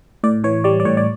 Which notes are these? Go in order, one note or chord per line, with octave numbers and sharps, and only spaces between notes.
A2 D5
E3 C#5
G3 D5
D5
A2 C#5
D5